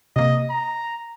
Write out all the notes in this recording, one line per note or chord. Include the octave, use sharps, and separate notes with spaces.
C3 A#3 D#5
A#5